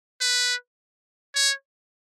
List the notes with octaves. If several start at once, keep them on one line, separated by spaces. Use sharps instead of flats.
B4
C#5